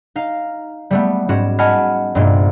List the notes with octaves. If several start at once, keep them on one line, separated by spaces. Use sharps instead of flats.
D#4 F5
G3 A3 B3
G#2 G3 C#4 F#4 E7
D#5 F#5 G#5 A5 B5 F6
C2 G2 A#2 G#3 A#3